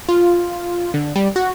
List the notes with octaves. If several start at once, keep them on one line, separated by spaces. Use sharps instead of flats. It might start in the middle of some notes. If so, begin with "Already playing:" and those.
F4
D3
G3
F#4